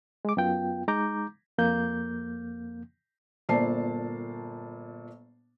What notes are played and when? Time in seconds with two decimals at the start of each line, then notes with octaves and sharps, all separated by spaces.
0.25 G#3 D6
0.37 F#2 B3 F4 G5
0.88 G#3 D#4 A#5 D6 G6
1.58 F2 A#3 G6
3.49 G1 A#2 C5 D5 A5 C7